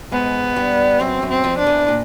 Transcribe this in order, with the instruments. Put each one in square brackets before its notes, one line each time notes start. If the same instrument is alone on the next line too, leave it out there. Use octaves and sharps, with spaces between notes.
[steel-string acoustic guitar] G#2 G#3 [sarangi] B3
[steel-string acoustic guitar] G2 G3
[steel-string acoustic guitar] F#2 F#3 [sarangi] C4
[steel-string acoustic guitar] F#2 F#3
[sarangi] C4
[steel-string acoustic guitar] F2 F3
[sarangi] D4
[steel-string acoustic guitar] E2 E3
A#2